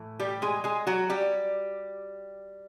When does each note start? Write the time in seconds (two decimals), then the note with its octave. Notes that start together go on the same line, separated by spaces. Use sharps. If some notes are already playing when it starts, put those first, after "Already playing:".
Already playing: A2 E3 A3
0.20 G3 G4
0.42 G#3 G#4
0.64 G#3 G#4
0.87 F#3 F#4
1.10 G3 G4